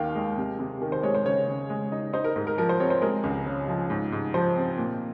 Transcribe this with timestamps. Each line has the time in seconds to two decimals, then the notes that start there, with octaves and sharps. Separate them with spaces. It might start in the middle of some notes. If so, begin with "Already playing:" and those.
Already playing: D#2 D#3 F5 G5 F6
0.15 G#3
0.38 C3
0.59 C3
0.82 D#3
0.92 C5
1.03 G#3 C#5
1.15 C5
1.26 C#3 C#5
1.48 C#3
1.70 G#3
1.92 D#4
2.13 D#4 C5
2.24 A#4
2.36 G#2 A#4
2.47 A#4
2.58 F3 A#4
2.69 C5
2.80 C4 C#5
2.90 C5
3.02 G#3 A#4
3.24 C#2
3.46 C#3
3.68 F3
3.90 G#2
4.12 G#2
4.34 F3 C5
4.56 C4
4.78 A#2